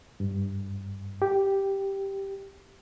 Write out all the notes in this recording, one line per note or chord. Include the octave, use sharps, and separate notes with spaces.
G2
G4